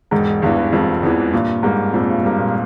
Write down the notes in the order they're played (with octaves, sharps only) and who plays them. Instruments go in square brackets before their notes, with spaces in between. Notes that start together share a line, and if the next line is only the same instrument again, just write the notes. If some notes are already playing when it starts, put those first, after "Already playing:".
[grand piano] E1 [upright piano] G#2
[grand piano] E2 E3 [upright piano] G2
[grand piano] E1 [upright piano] F2
[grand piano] E2 E3
[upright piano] G2 [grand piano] A#2
[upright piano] G#2 [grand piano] G3 A#3
[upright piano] F2 [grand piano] A#2
[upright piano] G2
[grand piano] G3 A#3
[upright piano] A#2